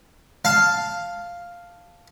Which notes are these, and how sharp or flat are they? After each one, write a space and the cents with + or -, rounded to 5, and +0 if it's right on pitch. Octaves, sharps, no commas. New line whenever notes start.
F5 +0 A5 +0